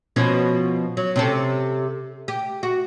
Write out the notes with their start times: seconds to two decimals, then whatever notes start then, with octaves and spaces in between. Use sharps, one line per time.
0.16 B2 F3 C#4
0.97 F#3
1.16 C3 C#4 A4
2.28 G4
2.63 F#4